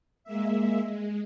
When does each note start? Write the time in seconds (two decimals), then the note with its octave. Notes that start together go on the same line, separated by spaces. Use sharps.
0.24 G#3 A#3 E5
0.86 G#3